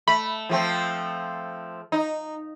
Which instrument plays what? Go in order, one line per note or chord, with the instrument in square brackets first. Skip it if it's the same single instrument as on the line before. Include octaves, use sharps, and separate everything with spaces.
[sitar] A3 [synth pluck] B5
[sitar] F3 A3 C4
D#4